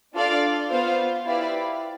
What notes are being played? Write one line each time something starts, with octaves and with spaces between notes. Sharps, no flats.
D4 F4 A4 D5 F5
B3 F4 C5 F5
E4 G4 B4 D5 F5